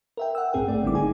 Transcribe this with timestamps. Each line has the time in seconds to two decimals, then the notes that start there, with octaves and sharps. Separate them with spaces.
0.17 A#4 E5 G5
0.35 F#5 E6
0.53 A#1 G#2 C4 G#4 A#4 G5
0.68 A3 G#4 D5
0.83 G#1 D3 G3 C4 E4 D6
0.95 D#4 G#4 G#5